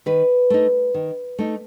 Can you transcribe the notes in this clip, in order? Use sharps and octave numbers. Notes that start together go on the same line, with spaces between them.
D#3 B4
A3 D#4
D#3
A3 D#4